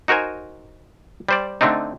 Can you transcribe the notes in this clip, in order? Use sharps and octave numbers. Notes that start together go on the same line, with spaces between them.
D#4 F#4 A#4 C5 G#5
G3 C5 D5
D3 A3 C4 D4 D#4